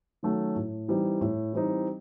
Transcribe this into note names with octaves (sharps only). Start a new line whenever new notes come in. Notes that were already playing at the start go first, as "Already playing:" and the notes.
D#3 F#3 A3 C#4
A2
E3 G3 C4 D#4
A2
E3 G3 C4 D#4